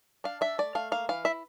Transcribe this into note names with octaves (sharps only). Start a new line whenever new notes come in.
D4 F5
D4 E5
A3 D5
A3 F5
A#3 F5
E3 F5
E4 E5